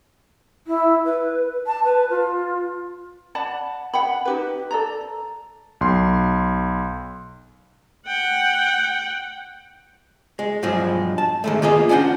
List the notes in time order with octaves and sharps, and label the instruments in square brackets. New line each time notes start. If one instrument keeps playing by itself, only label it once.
[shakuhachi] E4
B4
A5
B4
F4
[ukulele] D5 F#5 A5 B5
F#5 G5 B5
D#4 G4 B4
A4 D5 A#5
[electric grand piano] B1 C6
[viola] F#5 G5
[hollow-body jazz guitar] G#3
G2 B2 F3 F#3 G#3
A5
D#3 G#3 A3
A#3 B3 F4 G#4 D#5
C#4 D4 F4 F#5 G5